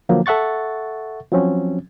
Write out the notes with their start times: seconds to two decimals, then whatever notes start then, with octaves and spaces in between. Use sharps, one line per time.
0.09 D3 F3 F#3 A#3
0.26 A4 E5 F#5 C#6 A6
1.31 F3 F#3 C4 C#4